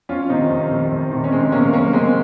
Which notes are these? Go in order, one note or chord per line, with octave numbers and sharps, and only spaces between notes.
F2 C#4 F4
C3 D#3 C4 D#4
F2
C3 D#3
F2
C3 D#3
C#4
F2 G#3 C4
C3 D#3 A#3 C#4
F#2 A#3 C#4
C#3 G#3 C4
C4